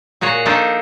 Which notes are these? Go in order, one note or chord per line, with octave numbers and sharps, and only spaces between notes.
A#2 F#4 G#4 C#5
F3 A#3 D4 D#4 A4